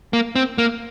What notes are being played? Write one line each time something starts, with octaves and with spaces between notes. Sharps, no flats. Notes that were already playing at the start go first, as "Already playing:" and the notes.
A#3
C4
A#3